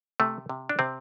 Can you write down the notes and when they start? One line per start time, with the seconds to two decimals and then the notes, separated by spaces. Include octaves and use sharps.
0.20 C3 A3
0.49 C3
0.69 D4
0.79 C3 C4